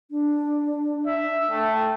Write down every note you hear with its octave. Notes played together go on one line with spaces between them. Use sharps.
D4
E5
A3 G5